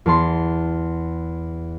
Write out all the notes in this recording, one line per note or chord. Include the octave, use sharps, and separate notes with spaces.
E2 A5 C6